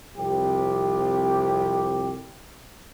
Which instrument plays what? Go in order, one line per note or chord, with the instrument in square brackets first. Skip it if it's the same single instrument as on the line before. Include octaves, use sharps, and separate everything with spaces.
[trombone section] C2 F2 G4